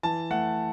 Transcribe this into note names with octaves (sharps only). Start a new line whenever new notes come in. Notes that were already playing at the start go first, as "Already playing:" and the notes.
E3 A5
A3 F#5